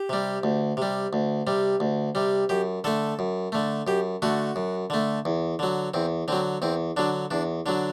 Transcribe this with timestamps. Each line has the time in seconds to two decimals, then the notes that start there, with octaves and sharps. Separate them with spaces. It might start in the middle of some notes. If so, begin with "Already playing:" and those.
Already playing: G4
0.09 C3 G3
0.43 D2
0.77 C3 G3
1.13 D2
1.47 C3 G3
1.80 D2
2.15 C3 G3
2.49 F#2 G4
2.84 D3 A3 A4
3.19 F#2
3.52 D3 A3
3.87 F#2 G4
4.22 D3 A3 F#4
4.56 F#2
4.90 D3 A3
5.25 E2
5.59 D3 F#3
5.94 E2 C4
6.28 D3 F#3 C4
6.62 E2 C4
6.97 D3 F#3 D4
7.31 E2 D4
7.66 D3 F#3 D4